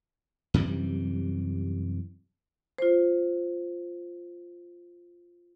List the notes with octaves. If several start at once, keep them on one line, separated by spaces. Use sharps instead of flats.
F#2 C3 E3 G3
F4 C5